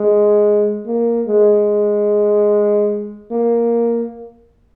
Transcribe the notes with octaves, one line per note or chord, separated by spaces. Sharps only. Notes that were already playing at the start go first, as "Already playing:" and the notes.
Already playing: G#3
A#3
G#3
A#3